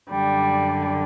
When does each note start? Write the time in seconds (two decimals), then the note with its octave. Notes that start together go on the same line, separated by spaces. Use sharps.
0.11 F#2 D3 G3